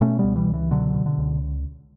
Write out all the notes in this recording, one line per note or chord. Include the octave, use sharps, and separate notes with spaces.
B2 A3 C#4
C#2 G3 B3
E3 G3
C#2
E3
B2 D3 F#3
B2
D3
C#2